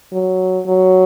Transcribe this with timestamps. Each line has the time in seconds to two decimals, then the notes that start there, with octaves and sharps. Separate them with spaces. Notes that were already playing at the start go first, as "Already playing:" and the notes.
0.12 F#3
0.67 F#3